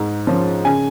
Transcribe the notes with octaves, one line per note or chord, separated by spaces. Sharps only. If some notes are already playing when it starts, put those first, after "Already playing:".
Already playing: G#2
F3 C#4 F4
C#3 G#5